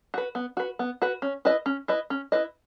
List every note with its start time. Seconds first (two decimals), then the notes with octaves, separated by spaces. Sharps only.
0.14 F#4 B4
0.35 B3
0.57 F#4 B4
0.79 B3
1.02 F#4 B4
1.22 C#4
1.45 E4 B4 D#5
1.66 C#4
1.88 E4 B4 D#5
2.10 C#4
2.32 E4 B4 D#5